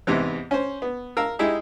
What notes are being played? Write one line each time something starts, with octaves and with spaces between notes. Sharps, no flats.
E2 G#2 C3 E3
C#4 C5
B3
A#4 F5 E6
G#3 D#4 E4 G4 G#4